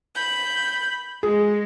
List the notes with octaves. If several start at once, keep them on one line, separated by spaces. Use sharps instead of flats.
B5 G6
G#3 G#4